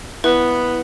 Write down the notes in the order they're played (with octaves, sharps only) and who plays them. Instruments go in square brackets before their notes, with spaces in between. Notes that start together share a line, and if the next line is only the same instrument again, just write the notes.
[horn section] B3 [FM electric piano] E4 [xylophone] B4